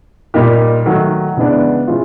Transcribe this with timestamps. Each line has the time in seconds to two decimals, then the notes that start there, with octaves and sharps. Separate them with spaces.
0.34 A#2 G3 A#3 D#4 G4
0.86 D#3 F#3 A3
1.36 C#3 E3 G#3 B3 D4
1.88 E3 G#3 C#4 F4